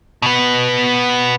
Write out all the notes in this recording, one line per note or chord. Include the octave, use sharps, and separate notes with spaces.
B2 B3